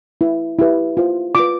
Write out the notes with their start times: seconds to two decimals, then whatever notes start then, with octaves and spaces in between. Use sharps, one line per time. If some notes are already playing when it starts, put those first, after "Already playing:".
0.21 E4 B4
0.59 E4 G4 B4
0.97 F4 C5
1.35 F4 B4 D6